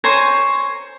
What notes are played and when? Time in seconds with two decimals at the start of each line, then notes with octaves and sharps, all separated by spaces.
0.04 C5 C#5 G#5 A#5